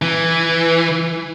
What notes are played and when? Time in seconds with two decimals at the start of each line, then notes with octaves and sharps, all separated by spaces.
0.02 E3